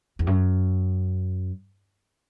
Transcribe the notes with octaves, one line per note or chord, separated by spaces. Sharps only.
E2
F#2